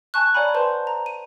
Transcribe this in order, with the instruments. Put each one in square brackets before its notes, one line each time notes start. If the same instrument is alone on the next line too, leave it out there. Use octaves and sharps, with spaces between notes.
[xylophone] G#5 A5 C#6 F#6
C#5 D5 F#5 G#5 A#5 B5
B4 C5 A5 C6
A#5
D#7